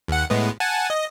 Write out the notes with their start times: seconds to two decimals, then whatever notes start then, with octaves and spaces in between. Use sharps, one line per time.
0.08 D#2 F#5
0.30 A2 G#3 B3
0.60 F#5 G#5 A5
0.90 D#5